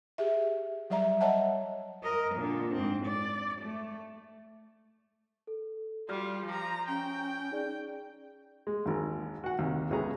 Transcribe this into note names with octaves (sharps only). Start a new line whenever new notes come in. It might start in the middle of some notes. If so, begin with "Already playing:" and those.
G4 G#4 E5
F#3 G3 D5 E5 A#5
C#5 D#5 E5 F#5 A5
A#4 D#5
A#2 D3
G#2 C4
D5
A3
A4
G3 F4 F#4 D5 F6
F3 A#5
C#4 G5
D#4 G#4 D5
G#3
G#1 D#2
F#4 F#5
D#2 C3
C#2 A2 B3 C#4 G#4 A#5